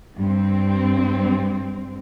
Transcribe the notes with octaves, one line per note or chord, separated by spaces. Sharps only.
G2 C4